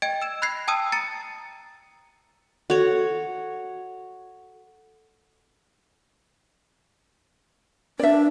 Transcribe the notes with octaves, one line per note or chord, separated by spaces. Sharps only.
D#5 G5 G#6 D7
E6 E7
B5 F#6 G#6 A#6 C7
G5 A5 D#6 E6 D#7
A#5 A6 C#7 D#7
F#4 A4 C#5
D4 D5 E5